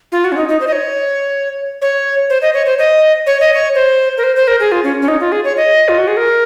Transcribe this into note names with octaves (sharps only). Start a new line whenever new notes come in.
F4
F#4
C#4
D#4
D#4
C5
D#5
C#5
C#5
C5
D#5
C#5
C5
D#5
C#5
D#5
C#5
C5
A#4
C5
C5
A#4
G#4
F4
C#4
C#4
D#4
F4
G#4
C#5
D#5
F4
F#4
G#4
A#4